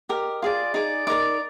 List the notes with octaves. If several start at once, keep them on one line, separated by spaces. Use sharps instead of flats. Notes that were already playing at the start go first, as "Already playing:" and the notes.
G4 A#4 D#5
F4 G#4 D5
D#4 G#4 D5
D#4 A#4 D5 D6